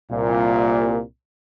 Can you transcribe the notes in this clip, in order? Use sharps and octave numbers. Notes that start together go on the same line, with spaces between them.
C2 A#2